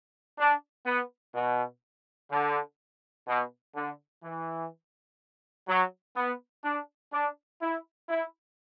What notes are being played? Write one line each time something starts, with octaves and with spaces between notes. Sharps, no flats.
D4
B3
B2
D3
B2
D3
E3
F#3
B3
D4
D4
E4
E4